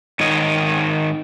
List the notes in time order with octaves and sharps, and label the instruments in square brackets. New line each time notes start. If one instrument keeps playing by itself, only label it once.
[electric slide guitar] G#2 D#3 C#5 D#5